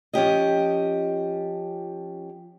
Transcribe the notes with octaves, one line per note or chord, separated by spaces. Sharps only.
F3 C#4 G4 D#5